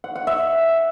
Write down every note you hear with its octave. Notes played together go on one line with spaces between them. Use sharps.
F#5
F#5
E5